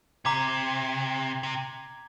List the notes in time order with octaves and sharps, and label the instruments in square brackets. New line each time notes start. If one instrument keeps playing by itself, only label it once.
[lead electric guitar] C3 [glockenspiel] A#5 D6 G#6
[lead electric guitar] C3